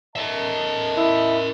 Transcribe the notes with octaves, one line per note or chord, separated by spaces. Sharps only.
B1 A#4 D#5 E5 A5
E4